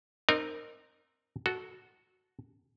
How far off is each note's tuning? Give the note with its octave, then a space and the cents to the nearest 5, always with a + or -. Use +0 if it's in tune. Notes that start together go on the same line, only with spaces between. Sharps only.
C4 +10 D#4 -30 A#4 +0
F#4 +0 A4 -15